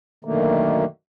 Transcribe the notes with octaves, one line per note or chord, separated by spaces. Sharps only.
F#2 B2 D3 D#3 A3 A#3